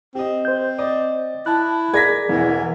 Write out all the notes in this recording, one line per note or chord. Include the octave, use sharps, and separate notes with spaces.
C4 G4 D#5
C5 G6
D5 D#5
E4 A5 F#6
G#4 A#4 D5 G#6 A#6 B6
E1 E2 E3